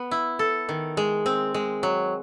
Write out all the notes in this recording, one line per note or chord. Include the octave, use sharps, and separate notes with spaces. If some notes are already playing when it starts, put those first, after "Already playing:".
Already playing: B3
E4
A4
D#3
G#3
C4
G#3
F#3